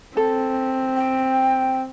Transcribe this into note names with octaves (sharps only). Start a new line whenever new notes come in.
C4 A4
G5